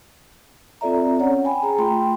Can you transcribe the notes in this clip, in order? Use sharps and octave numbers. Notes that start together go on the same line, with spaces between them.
C4 F4 A4 D5 E5 A#5
C#4 C#5 F#5
G5 G#5 B5
G#4 A#5
A3 F4 G5 B5 C6